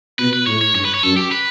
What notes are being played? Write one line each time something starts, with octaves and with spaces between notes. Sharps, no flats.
B2 B4
B4
A2 C#5
C#5
G2 C#5
B4
C#5
F#2 A4
G4
B4